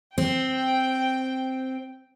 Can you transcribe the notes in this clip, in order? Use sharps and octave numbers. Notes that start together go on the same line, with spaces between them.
C4 G5